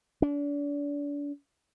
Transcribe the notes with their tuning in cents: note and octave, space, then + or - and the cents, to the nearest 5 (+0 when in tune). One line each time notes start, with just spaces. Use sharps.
D4 -35